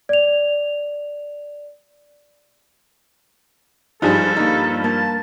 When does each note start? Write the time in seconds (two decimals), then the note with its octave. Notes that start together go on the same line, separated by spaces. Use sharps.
0.09 D5 F7
4.02 G2 F3 G3 D#4 G#4 A4 C5
4.37 A#3 D#4
4.84 A#3 A5